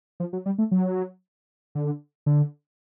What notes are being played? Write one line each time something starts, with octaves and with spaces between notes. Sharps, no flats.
F3
F#3
G3
A3
F#3
D3
D3